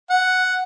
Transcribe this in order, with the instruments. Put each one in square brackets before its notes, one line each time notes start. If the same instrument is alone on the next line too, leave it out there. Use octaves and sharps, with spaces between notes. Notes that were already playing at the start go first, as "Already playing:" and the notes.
[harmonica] F#5